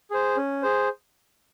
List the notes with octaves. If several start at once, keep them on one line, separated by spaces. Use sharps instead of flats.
G#4 C5
C#4
G#4 C5